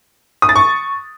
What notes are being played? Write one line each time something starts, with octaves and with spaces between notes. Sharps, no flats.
D#6
A6
C#6